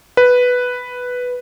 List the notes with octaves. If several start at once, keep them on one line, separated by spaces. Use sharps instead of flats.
B4